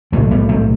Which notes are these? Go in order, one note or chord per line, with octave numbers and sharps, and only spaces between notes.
B1 A2 F3 A3
G3 B3
A3 C4